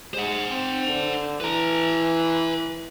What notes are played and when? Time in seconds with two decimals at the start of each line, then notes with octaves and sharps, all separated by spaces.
0.14 G#3 C5 F#5
0.50 C4
0.87 D3
1.40 E3 B4 A#5